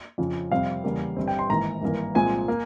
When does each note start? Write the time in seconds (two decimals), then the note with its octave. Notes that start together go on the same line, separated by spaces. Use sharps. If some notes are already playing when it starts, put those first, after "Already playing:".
0.18 F2 C#3 F3
0.52 F2 C3 G3 C4 F5
0.84 E2 C#3 G3 A#3
1.16 G1 G2 G3 C4
1.28 G5
1.39 C6
1.50 G#1 G#2 E3 A#3 A#5
1.82 G#1 G2 E3 A#3
2.15 C2 A#2 F3 G#3 C4 G#5
2.48 A#3